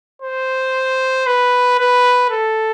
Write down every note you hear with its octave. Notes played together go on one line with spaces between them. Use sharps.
C5
B4
B4
A4